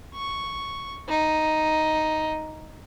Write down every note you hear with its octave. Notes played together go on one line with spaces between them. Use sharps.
C#6
D#4